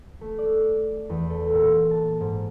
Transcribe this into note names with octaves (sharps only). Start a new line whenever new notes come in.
A3
D5
E2
A4
A#2
A5
G#2